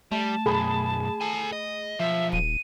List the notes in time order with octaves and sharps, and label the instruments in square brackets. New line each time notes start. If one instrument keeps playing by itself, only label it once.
[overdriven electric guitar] G3 [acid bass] A3 [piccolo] A5
[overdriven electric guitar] B1 F#2 [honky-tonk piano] G#4 B5
[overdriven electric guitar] A4 G#5
D#5
[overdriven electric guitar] B1 F3 [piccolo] E5
[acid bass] D#1 [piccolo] D#7